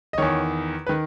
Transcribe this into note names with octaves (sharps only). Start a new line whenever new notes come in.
D#5
E2 D#3 C#5
B4
D#3